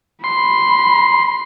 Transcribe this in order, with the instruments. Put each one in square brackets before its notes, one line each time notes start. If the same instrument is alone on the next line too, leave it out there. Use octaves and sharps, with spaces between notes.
[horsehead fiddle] B5 [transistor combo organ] C6